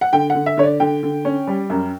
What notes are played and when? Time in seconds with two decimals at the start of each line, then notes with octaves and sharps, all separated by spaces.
0.01 F#5
0.13 D3 G5
0.30 F#5
0.35 D3
0.46 E5
0.57 D3 C#5
0.63 D5
0.80 D3 G5
1.03 D3
1.25 C#4
1.47 G3
1.70 F#2